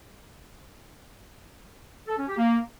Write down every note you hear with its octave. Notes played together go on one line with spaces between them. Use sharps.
A4
C#4
G4
A#3